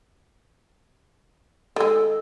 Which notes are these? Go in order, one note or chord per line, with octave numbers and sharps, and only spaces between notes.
D#3 G#3 A4